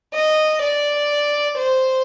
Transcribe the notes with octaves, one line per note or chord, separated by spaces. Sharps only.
D#5
D5
C5